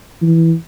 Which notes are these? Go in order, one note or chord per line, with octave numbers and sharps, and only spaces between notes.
E3